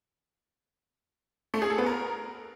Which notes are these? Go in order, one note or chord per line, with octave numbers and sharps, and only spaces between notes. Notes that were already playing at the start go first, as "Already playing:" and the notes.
A3
G#4
A4
B3
A#4